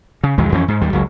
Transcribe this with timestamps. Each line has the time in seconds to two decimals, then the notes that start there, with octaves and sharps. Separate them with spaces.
0.23 C#3
0.38 B1 E2 D#3 G#3
0.52 F2 E3 A#3 C#4
0.68 G#2
0.81 D#2 G3
0.93 F#1 C#2 F#3